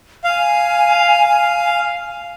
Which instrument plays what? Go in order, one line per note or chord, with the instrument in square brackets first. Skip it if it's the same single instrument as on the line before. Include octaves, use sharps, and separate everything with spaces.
[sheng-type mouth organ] F5 [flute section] G#5